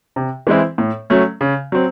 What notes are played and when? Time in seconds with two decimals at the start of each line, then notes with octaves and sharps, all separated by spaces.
0.16 C3
0.47 E3 G#3 C4 E4
0.78 A2
1.10 F#3 A3 C#4
1.41 C#3
1.72 F#3 C4